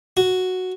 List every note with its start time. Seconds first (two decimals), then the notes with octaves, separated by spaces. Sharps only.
0.17 F#4